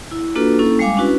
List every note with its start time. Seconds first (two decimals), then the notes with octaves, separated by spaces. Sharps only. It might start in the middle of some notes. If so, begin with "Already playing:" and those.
0.11 E4
0.36 A#3 D4 F4 F#4 A4 B4
0.59 A#3 C#4 E4 A4
0.79 G3 G#3 F5 G#5 D6
0.97 C#4 D4 E4 F#4 B4